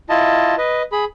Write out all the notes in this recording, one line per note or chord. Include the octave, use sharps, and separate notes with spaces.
E4 F4 D#5 A5
B4 D#5
G#4 B5